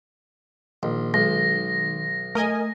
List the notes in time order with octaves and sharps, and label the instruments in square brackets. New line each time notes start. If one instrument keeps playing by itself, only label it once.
[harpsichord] A#1 [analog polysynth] D#3
[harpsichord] B1 [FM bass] G#3 [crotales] A#6
[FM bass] A3 [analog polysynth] A#4 D#5 G#5